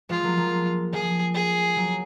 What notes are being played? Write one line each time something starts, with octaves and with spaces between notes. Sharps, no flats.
F3 G#3 F4
F#3 A#3
F3 G#3
F3 G#4
G#4
F#3